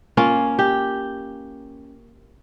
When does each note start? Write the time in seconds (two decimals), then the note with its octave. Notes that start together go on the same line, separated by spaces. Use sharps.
0.17 A#3 C#4 F4
0.59 G4